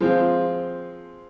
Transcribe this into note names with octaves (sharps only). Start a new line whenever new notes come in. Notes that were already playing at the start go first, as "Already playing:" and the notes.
F3 G#3 C4 F4